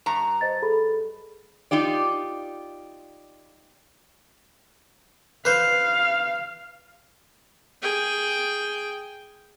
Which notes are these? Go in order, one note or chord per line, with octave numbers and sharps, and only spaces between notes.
G2 A#5
C5 D#5 A6
G#4 A4 B5
D#4 F4 G4 D5
B4 C5 F5
G#4 G5